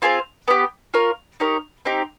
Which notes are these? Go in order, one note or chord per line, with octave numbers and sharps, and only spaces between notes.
C4 F4 G#4 C5
B3 D#4 G4
F4 A#4 C#5
D#4 G4 A#4 C#5
C4 D#4 G4